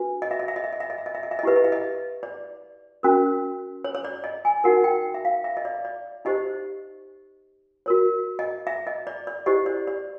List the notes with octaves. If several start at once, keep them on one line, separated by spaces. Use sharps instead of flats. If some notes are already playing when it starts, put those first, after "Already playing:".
Already playing: D4 F#4 B4
D#5
E5
D#5
E5
D#5
E5
D#5
E5
D#5
E5
D#5
E5
D#5
E5
D#5
E4 G4 B4 E5
D#5
E5
D#5
D5
C#4 F#4 A#4
C#5
C#5
D5
D#5
G#5
D#4 F#4 A#4 F#5
G5
E5
F5
E5
D#5
D5
D5
D#4 G4 C5 D#5
F#4 A#4 C#5
D#5
E5
D#5
D5
D5
E4 G4 C5 D#5
D5
D5